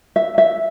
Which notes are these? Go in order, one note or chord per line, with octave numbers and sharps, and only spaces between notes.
E5
E5